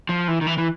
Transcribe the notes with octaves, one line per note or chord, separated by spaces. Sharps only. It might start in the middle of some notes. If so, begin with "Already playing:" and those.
F3
E3
D#3
E3
E3